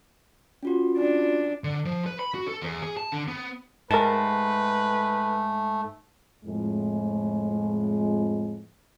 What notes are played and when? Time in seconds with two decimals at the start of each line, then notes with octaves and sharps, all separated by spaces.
0.63 C#4 F4 F#4
0.97 D4
1.64 D3
1.85 F3
2.06 B4
2.19 B5
2.34 F#4
2.48 A4
2.62 E2
2.82 G#4
2.97 A5
3.12 D3
3.28 B3
3.91 G#2 A3 A#4 B4 A5
6.45 F2 A2 G#3